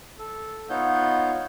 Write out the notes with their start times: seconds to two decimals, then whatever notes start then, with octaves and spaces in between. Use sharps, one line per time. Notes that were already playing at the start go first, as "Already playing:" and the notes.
0.19 A4
0.70 B3 D#4 F4 C#5 F#5 G6